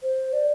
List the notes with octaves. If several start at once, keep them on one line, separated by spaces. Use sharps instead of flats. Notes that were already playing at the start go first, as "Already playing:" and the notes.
C5
D5